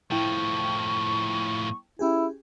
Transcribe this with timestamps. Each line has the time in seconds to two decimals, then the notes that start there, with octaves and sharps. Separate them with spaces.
0.11 A2 F3 E4 G5 A5 C#6
1.99 C#4 E4 G4 G#4